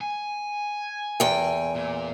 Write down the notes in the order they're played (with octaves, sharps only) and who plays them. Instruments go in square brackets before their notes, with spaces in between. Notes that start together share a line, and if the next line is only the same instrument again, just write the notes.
[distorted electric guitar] G#5
[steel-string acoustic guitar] E2 G5
[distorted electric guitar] A#2